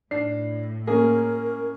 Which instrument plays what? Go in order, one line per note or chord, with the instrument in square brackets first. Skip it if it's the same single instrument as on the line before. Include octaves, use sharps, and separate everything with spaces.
[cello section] A2 [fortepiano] D4 [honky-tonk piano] C7
[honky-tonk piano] A#3 C#4 [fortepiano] G#4 [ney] A#4